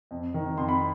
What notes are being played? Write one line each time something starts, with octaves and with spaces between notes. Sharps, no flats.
F2
D#3
F2 C6
B5